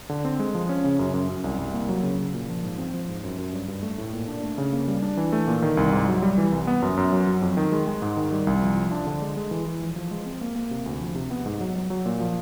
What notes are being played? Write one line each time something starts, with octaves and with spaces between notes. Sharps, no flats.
D3
C4
G#3
F3
C#4
C#3
F#2
F#2
F#2
C2
C2
A#3
F#3
C#3
C#3
A#2
F3
G#2
C4
F3
G#2
F#2
F#2
G2
G2
A3
A2
A#2
D4
A3
C#3
A#3
G3
D4
E3
A3
A#2
D#3
C2
G#2
F#3
G3
E3
C2
B3
F#2
F#2
F#3
F#3
F2
D#3
G#3
G#3
G#2
D#3
G3
C2
F3
F3
D4
D3
G#3
G#3
E3
E3
F3
F3
G#3
C4
A#3
A#3
C3
D2
F3
C3
B3
G#2
F#3
F#3
F#3
A#2
F3